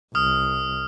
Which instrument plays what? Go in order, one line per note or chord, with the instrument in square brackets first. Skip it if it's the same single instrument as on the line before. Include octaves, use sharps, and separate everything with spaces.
[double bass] C2 [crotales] D#6 F6